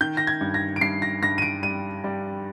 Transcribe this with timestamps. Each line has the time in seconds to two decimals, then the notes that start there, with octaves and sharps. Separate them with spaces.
0.01 D#3 G6
0.17 A#6
0.27 G#6
0.41 G2
0.54 A#6
0.76 D7
0.81 G2 C7
1.02 A#6
1.22 G2 A#6
1.38 D#7
1.42 D7
1.63 G3 D#7
2.04 G3